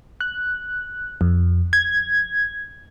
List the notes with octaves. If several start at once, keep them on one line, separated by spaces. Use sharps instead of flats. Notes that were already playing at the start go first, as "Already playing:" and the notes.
F#6
F2
G#6